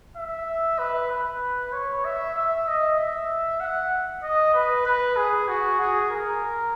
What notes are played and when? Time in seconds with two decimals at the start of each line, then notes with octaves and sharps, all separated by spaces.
0.17 E5
0.79 B4
1.11 B4
1.73 C#5
2.05 E5
2.35 E5
2.67 D#5
2.98 E5
3.61 F#5
4.23 D#5
4.54 B4
4.86 B4
5.17 G#4
5.48 F#4
5.80 G#4
6.11 A#4